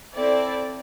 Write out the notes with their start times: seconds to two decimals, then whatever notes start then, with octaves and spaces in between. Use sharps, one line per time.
0.14 C4 E4 A4 D5